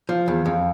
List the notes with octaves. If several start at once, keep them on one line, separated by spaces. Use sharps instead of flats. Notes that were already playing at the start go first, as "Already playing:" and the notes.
F3
E2
F2